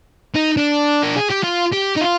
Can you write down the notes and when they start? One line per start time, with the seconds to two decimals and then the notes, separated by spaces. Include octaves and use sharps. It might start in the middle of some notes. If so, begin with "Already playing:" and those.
0.35 D#4
0.57 D4
1.03 A#4
1.16 G#4
1.30 G4
1.43 F4
1.72 G4
1.96 D#4
2.01 F4